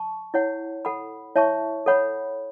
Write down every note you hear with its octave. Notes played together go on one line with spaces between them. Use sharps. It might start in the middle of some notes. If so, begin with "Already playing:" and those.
Already playing: A5 C#6
E4 C#5 F#5
A4 F#5 B5
E4 C#5 E5 A5 C#6
A4 C#5 F#5 B5